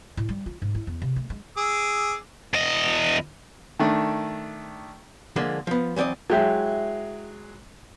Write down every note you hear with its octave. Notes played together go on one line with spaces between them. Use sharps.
A2
G3
F4
G#2
E4
E2
C3
A3
G#3
G#4 D6 E6
E2 D#5
D#3 A3 D4
D3 F3 G#3 A#3 D4
F3 B3
E3 F#3 C4 D5 D#5
F#3 G#3 E4 G4 E5